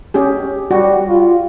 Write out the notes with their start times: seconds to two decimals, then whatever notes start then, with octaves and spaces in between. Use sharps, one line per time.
0.14 C#4 G4 G#4
0.71 G3 F#4
1.09 F4